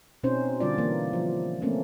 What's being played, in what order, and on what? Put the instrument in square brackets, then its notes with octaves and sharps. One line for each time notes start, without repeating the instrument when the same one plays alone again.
[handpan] B2 C4 C#4 D#4 C5
D3 G3 F4 D5
E3 A#3
F3
A3 A#3 C4 C#4